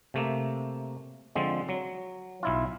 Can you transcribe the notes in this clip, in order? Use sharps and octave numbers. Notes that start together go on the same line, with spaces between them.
C3 A3 A#3
D3 F3 G#3 C4
F#3
B1 E4 F4